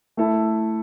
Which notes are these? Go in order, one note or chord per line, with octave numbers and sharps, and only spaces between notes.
A3 E4 A4